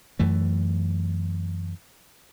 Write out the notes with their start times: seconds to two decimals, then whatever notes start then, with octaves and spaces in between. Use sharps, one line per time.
0.19 F#2 E3 A3